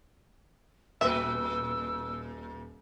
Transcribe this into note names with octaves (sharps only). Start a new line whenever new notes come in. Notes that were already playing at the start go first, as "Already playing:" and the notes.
D#1 A#2 B4 E5 E6